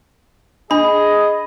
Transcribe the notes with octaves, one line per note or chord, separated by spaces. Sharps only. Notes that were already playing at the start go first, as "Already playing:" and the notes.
D4 G#4 D#5 B5